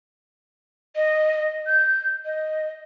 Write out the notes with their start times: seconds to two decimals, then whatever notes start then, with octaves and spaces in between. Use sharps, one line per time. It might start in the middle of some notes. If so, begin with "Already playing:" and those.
0.96 D#5
1.67 G6
2.25 D#5